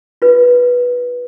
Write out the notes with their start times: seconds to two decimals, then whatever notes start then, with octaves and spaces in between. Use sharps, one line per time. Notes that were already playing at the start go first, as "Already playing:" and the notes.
0.22 F4 B4